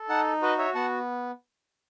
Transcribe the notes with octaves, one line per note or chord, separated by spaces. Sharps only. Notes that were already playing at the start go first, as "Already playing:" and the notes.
Already playing: A4
D#4 F#5 A5
F#4 B4 D#5
C#5 E5
B3 F#5 A5